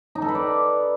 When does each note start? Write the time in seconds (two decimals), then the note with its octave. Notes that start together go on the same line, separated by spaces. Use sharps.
0.15 D#4
0.22 A4
0.28 B4
0.35 D5